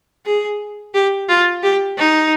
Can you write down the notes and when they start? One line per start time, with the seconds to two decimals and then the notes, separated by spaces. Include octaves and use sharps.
0.26 G#4
0.94 G4
1.29 F4
1.63 G4
1.98 D#4